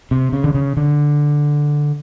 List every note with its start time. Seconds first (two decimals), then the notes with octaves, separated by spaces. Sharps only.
0.11 C3
0.33 C#3
0.44 D3
0.54 C#3
0.77 D3